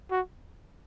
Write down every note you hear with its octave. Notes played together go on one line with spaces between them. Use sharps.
F#4